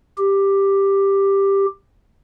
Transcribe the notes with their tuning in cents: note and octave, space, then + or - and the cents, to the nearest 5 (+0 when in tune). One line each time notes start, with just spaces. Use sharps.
G4 +5